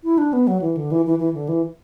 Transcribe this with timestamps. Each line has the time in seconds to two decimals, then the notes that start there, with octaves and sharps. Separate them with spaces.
0.04 E4
0.18 D4
0.33 B3
0.47 F#3
0.62 E3
0.77 D3
0.91 E3
1.06 E3
1.19 E3
1.34 D3
1.49 E3